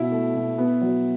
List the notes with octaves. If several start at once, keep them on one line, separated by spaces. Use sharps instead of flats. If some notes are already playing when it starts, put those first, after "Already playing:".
Already playing: B2 E4
A3
B2
B3
F#3